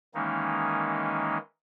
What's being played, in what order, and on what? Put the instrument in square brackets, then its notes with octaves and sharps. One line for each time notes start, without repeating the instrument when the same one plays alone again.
[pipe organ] D#3 E3 G#3 A#3 C#4 D#4